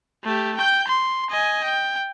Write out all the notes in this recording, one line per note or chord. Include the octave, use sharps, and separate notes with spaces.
A3 G4
G5 G6
C6
D#5 G#5
G5